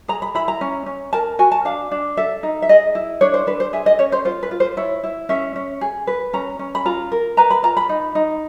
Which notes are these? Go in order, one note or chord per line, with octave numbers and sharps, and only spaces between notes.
G#4 A#5
B5
E4 B5
A#5
C#4
C#4
A#4 A5
F#4 G#5
A5
D4 F5
D4
A4 E5
D#4
E5
G#4 D#5
E4
D4 C#5
C5
D4 B4
C5
G#4 E5
D#5
C#4 C#5
C5
F4 C5
B4
F4
C5
E4 C#5
E4
C#4 E5
C#4
G#4
B4
C#4 A#5
C#4
B5
F4 A#5
A#4
B4 A#5
B5
F4 A#5
B5
D#4
D#4